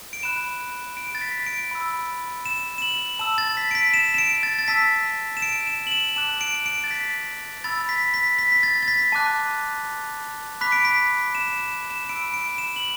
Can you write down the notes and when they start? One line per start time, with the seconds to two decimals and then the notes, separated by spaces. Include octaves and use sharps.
0.13 D7
0.23 B5 F#6 E7
0.97 D7
1.15 A6
1.21 B6
1.46 D7
1.71 B5 E6
2.46 E7
2.78 E7
2.82 F#7
3.19 A5 E6 E7
3.38 A6
3.57 B6
3.71 D7
3.75 B6
3.94 E7
4.14 E7
4.18 D7
4.43 A6
4.59 A6
4.68 A5 E6 B6
5.37 E7
5.42 D7
5.67 E7
5.87 F#7
5.92 E7
6.16 A5 D6 F#6 E7
6.41 D7
6.66 D7
6.84 A6
6.91 B6
7.64 B5 E6 A6
7.89 B6
8.14 B6
8.39 B6
8.52 B6
8.63 A6
8.82 A6
8.88 B6
9.12 A5 D6 F#6
10.61 B5 D6 F#6 B6
10.72 D7
10.85 B6
11.35 E7
11.53 E7
11.72 E7
11.91 E7
12.09 B5 E6 D7
12.34 D7
12.58 E7
12.76 F#7